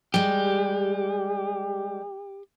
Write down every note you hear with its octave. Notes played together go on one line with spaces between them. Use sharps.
G3 G#3 G4